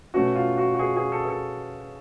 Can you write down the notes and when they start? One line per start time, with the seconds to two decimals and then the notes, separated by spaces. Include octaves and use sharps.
0.14 B2 A3 C#4 F#4
0.36 F4
0.57 F#4
0.75 F#4
0.79 G#4
0.96 G#4
1.12 A4
1.24 G#4
1.28 A4